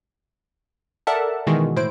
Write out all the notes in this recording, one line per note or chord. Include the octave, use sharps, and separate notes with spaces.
A4 A#4 D5 E5 F#5 A5
B2 D#3 E3 G#3 F#4 G#4
A2 E4 C5 D7